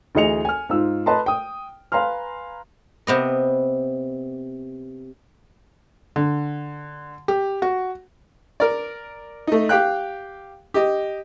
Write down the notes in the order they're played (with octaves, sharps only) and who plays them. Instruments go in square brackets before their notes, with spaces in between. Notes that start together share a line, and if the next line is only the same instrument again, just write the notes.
[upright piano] D2 E3 G#4 D#5 C#7 F7
G#5 F6
G#2 F4 E6
B4 D#5 A5 A#5 C6
G5 D#6
B4 F5 G#5 A#5 C6 F6
[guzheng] C3 B3 D#5
[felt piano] D3
G4
F#4
[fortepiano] A#4 D5
A3 D#4
G4 F5 G5 F#6
G4 D#5